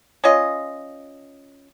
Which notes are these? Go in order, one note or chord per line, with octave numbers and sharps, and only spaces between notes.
C#4 F4 D#5